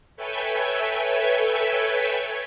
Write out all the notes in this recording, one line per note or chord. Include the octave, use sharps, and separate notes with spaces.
A4 B4 C#5 E5 G5 G#5